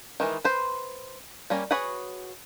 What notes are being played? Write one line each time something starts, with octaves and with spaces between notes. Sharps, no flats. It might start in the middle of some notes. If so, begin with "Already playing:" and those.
D#3 E3 G#3
B4 C5
G3 A#3 C#4 A#5
F#4 G#4 B4 C#5 F#5